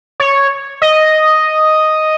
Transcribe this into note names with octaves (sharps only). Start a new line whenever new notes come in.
C#5
D#5